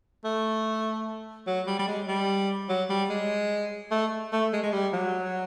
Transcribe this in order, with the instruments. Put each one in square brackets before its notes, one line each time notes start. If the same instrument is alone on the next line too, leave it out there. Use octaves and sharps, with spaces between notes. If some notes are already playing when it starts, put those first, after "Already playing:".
[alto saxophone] A3
F#3
G3
G3
G#3
G3
F#3
G3
G#3
A3
A3
G#3
G#3
G3
F#3